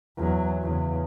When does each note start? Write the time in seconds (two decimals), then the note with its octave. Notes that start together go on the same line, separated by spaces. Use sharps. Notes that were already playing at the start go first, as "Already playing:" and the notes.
0.17 E2 F#3
0.63 E2 C#3